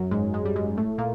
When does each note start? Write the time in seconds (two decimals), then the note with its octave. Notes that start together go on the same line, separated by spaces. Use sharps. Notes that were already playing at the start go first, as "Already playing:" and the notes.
Already playing: F#2 F#3
0.11 G#2 G#3
0.34 G#2 G#3
0.45 G3
0.56 G#2 G#3
0.77 A2 A3
0.98 A#2 A#3